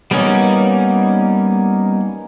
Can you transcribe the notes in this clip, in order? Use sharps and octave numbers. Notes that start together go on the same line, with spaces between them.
G3 A#3 B3 C#4 D#4